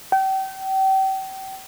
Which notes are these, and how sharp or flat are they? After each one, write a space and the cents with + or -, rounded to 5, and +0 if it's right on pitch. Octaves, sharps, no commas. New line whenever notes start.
G5 -35